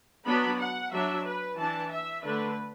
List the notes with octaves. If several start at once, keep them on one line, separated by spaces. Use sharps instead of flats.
F#3 B3 D4 B5
F#5
F#3 D4 E5
B4
E3 D4 A5
E5
D3 A3 D4 B4